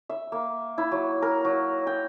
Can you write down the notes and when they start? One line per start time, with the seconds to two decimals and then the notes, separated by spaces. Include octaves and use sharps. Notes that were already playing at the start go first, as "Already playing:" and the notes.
0.09 E5
0.32 A#3
0.78 E4
0.92 F#3
1.22 A#4
1.45 F#3
1.87 G5